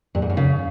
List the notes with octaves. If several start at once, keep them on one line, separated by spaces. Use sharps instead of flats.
G2
G#2
F#2
C#3